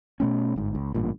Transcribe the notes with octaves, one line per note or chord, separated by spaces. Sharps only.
B2 A3 C#4
G1 G#2
C#2
A1 G2 A#2